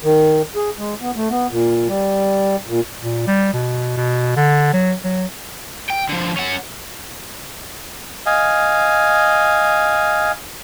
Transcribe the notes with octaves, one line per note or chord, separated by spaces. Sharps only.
D#3
G#4
G#3
B3
A3
B3
A#2
G3
A#2
A#2
G3
B2
B2
D3
F#3
F#3
G5
D3 F3
C#4 F#5
D#5 F5 G#5